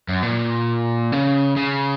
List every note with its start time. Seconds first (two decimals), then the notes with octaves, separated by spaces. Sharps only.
0.08 F#2
0.23 A#2
1.12 C#3
1.57 C#3